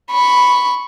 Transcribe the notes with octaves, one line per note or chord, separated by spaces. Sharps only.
B5 C#6